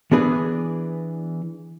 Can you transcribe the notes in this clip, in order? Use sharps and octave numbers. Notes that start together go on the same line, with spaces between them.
E3 B3 D4 G#4 B4